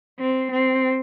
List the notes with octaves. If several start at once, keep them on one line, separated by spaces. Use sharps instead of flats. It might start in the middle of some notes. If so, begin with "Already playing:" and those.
C4
C4